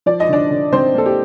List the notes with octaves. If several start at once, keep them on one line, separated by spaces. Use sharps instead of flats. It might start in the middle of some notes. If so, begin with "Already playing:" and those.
F3 D5
D#5
D3 D4 D5
D3
D3 C4 C5
A#3 A4
G4